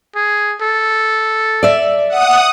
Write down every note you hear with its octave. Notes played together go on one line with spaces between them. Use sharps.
G#4
A4
D5 E5
F#5 D#6